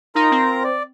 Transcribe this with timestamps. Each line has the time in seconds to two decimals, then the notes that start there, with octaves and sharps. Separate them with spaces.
0.15 D#4 F4 A#4 A#5
0.31 C4
0.64 D5